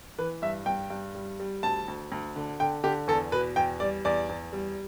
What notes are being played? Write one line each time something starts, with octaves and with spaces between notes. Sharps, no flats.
E3 B4
G2 E5
G2 G5
G2
G3
G3
D2 A5
D2
D2
D3
D3 G5
D3 G4
E2 A4
B2 B4
E2 G5
G3 D5
E2 D5
E2
G3